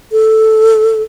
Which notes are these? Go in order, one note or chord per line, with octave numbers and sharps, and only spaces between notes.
A4